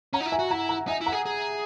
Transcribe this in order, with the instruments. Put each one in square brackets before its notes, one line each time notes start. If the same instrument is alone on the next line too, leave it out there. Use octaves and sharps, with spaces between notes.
[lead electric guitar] C#4 [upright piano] F#5 A#5
[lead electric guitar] D#4
E4
[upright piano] E5 G#5
[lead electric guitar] F#4
[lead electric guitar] E4 [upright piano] F#5 A#5
[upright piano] F#5 A#5
[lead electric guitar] D#4 [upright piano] E5 G#5
[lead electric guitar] E4
[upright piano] F#5 A#5
[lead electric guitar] G#4
G#4